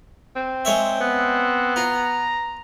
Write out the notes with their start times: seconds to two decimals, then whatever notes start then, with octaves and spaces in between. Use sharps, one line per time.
0.36 C4
0.65 G#3 C#5 E5
1.00 B3 C4
1.76 F4 A#5